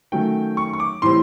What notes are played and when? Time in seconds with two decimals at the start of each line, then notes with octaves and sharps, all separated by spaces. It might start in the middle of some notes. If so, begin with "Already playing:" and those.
0.12 D#3 F#3 A3 C#4 G5
0.57 C#6
0.73 C#6
0.80 D6
1.02 A2 E3 G3 C4 C6